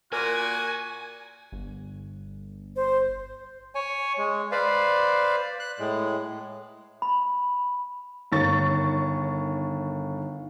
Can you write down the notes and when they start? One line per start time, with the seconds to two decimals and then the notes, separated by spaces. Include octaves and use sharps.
0.13 A#2 F#4 A#4 G#5
1.52 G1
2.76 C5
3.75 C#5 G#5
4.18 G#3
4.52 B4 C5 D5 F5
5.60 F#6
5.79 A2 G#3
7.02 B5
8.32 G1 D#3 C#5 C#6 A6